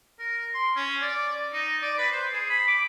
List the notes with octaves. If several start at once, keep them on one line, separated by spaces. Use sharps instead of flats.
A#4
C6
C#4
D5
D#4
D5
B4
C5
G#4
B5
D6